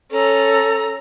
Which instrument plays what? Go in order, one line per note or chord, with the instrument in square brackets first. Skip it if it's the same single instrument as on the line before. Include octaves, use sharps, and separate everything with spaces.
[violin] C#4 A#5 [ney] A4